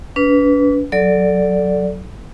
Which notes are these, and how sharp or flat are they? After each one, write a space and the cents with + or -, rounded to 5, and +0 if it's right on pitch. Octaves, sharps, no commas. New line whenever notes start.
D4 -45 B4 +0
F#3 -5 A4 +0 D5 -5